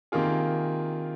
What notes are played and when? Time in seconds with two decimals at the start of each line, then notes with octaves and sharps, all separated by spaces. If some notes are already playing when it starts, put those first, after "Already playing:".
0.12 C3 D#3 A#3 F4 G#4